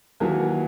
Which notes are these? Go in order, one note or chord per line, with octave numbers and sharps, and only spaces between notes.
D#2 E3 F#3